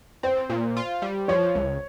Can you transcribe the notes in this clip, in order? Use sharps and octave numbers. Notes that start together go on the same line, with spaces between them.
C4 C5
A#2
F4
G3
F3 C#5
C#2